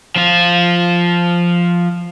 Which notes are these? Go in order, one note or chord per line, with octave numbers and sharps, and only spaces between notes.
F3 F4